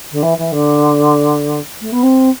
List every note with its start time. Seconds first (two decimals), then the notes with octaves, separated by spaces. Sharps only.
0.11 D3
0.22 E3
0.37 E3
0.52 D3
1.81 A3
1.92 B3
2.02 C4